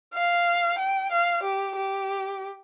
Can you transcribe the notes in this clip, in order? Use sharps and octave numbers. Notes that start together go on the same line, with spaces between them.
F5
G5
F5
G4
G4